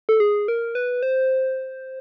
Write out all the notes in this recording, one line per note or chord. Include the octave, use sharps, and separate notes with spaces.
A4
G#4
A#4
B4
C5